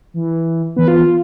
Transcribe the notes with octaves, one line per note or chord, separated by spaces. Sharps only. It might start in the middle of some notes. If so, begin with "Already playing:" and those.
E3
E3 B3 B4
F4